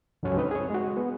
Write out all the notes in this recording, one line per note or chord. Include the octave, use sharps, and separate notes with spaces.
C#2 G2 F#3 C#4 A4 C#5
C4 D#4 B4 D#5
G#4 C#5
G#3 F#4
B3